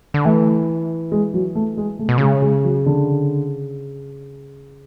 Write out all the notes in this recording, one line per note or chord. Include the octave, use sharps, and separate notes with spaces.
D3
E3 A3
G#3
F#3
A3
G#3
C#3 A3
B2
C#3 G#3
G#3
F#3
D3